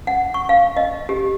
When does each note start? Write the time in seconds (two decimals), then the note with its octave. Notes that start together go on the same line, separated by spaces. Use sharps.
0.07 F#5
0.34 C#6
0.49 F5
0.77 D#5
1.09 G4